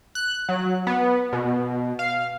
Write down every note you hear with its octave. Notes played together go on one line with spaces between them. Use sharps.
F#6
F#3
B3
B2
F5